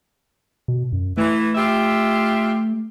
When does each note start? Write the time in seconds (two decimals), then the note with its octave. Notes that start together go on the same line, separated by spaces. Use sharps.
0.68 B2
0.93 F#2
1.17 E3 A3
1.55 F4 G4 E5